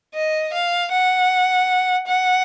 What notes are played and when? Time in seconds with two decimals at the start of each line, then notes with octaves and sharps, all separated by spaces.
0.14 D#5
0.53 F5
0.92 F#5
2.07 F#5